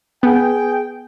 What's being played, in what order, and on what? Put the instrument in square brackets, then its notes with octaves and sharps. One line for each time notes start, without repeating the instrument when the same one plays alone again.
[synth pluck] B3 [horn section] G#4 G5